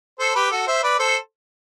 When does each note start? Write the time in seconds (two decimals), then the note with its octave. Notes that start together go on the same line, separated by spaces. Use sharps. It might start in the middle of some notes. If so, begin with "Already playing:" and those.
0.19 A4 C5
0.35 G4 B4
0.51 F#4 A4
0.67 C5 E5
0.83 B4 D5
0.99 A4 C5